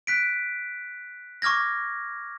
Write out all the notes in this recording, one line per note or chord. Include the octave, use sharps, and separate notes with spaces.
F#6 B6 D7
C#6 D6 F6 G#6 A#6